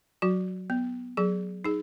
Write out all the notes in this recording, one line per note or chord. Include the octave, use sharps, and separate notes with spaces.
F#3 F#4
B3
F#3 G#4
D#4 G#4